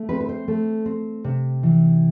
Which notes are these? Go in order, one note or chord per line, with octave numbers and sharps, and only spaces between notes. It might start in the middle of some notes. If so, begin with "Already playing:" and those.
Already playing: A3
C4 B4
B4
C5
A3
C4
C3
E3